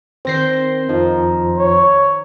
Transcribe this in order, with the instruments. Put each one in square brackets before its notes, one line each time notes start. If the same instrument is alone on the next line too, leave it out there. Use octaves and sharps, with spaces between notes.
[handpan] D#3 C5 [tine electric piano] C4 A#6 C7
[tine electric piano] F2 F3 [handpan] D#4
[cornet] C#5